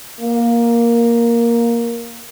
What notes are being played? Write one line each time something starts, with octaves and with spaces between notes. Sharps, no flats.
A#3